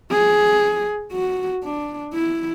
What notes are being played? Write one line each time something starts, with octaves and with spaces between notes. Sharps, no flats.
G#4
F#4
D4
E4